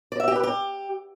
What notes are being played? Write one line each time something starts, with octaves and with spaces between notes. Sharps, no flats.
D5
E5
G4
B4
G4